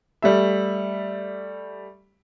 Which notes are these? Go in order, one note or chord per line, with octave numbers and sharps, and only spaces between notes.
G3 A3 E5